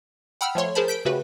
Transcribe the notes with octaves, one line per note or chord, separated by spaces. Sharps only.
F#5 G5 B5 E6 F6
F3 A3 C#5 C6
G#4 A#4 C5 A5 B5
G6 B6 D7
C#3 A3 F#4 G4 B4